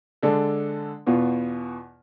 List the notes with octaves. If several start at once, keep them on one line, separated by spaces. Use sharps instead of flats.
D3 G#3 D4 A4
E2 B2 B3 F4